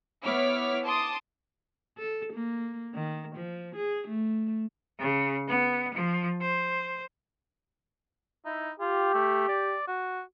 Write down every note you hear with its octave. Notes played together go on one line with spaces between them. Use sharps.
B3 E4 C#5 D6 F6 B6
A5 C6 D6 D#6
A4
A#3
D#3
F3
G#4
A3
C#3
B3
F3
C5
D#4 E4
F4 G4
A3
D5
F#4